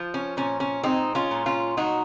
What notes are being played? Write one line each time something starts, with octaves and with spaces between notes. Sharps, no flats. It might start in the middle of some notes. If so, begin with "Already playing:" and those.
Already playing: F3
C#4
A#2 C#4
C#4
G#3 C4 D#4
C#4 F4
A#2
C#4 F4
F#3 D#4 F#4